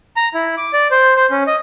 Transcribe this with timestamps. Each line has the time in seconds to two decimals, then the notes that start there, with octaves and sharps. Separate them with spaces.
0.16 A#5
0.34 E4
0.57 D6
0.73 D5
0.91 C5
1.17 C5
1.31 C#4
1.47 D#5